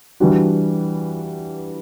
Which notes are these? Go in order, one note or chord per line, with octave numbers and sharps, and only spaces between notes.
E3 G3 D4 F#4